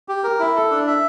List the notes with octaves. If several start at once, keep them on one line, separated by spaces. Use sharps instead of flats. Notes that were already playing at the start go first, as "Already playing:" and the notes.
G4
A#4
E4
A4
D4
E5